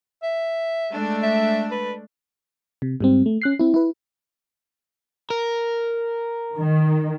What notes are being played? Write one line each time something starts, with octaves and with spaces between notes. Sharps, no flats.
E5
G#3 A3 D4
E5
B4
C3
G#2 G3 C4
A3
C#4 F#6 C7
C4 E4
E4 B4
A#4
D#3